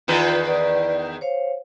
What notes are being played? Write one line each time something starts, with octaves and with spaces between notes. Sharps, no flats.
E2 D#3 F4 B4
D5
C5 C#5 F5